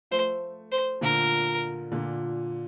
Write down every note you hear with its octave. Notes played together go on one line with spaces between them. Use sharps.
F3 A3 C5
C5
A#2 D3 A#4
A#2 D3